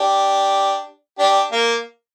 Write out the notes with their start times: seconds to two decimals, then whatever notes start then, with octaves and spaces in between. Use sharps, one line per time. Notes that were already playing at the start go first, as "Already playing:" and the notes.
Already playing: D4 G4
1.19 D4 G4
1.52 A#3